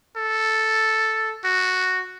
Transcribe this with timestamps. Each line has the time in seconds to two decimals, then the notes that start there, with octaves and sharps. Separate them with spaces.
0.16 A4
1.45 F#4